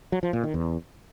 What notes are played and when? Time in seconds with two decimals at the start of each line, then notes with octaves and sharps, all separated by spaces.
0.12 F#3
0.23 F3
0.33 A#2
0.44 D#3
0.54 E2